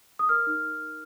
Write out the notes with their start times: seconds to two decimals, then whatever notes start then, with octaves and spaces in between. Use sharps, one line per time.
0.19 D#6
0.29 A#4 F6
0.47 D#4